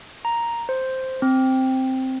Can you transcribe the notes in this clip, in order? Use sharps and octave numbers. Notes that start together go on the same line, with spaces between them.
A#5
C5
C4